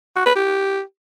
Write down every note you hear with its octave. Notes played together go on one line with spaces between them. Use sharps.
F#4
B4
G4